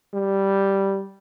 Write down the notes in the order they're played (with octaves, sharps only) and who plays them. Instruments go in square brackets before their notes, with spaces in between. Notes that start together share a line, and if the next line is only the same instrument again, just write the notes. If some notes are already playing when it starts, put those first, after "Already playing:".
[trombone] G3